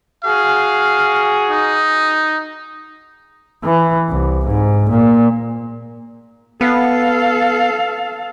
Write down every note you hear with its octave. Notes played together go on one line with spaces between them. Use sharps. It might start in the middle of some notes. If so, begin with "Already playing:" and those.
F#4 G#4 F5
D#4
E3
C2
G#2
A#2
B3 A4 F5